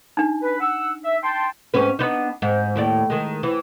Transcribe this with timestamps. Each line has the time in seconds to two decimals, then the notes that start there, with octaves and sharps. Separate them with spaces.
0.17 D4 D#4
0.42 B4
0.60 F#5 E6
1.05 E5
1.23 G5 A5 C6
1.74 G#2 C#4 B4
1.99 B3 D4 D#4
2.42 G#2
2.76 D#2 A2 D5
3.10 D#3 G#3
3.43 E3